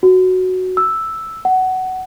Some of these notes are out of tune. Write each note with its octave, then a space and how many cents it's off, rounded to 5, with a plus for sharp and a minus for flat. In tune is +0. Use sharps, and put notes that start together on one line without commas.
F#4 +0
E6 +0
F#5 +15